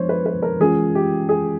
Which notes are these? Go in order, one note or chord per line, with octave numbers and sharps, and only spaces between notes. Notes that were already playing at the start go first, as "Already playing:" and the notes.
Already playing: F3 G#3 B3 D4 C5 C#5
B4
B4
A#4
E3 G#3 C#4 F4 G#4
G4
G#4